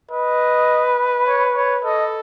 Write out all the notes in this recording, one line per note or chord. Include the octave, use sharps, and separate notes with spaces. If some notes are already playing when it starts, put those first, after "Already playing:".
B4 D#5
C#5
C#5
A4 D#5